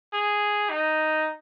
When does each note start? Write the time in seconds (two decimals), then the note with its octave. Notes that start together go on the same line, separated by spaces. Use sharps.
0.13 G#4
0.70 D#4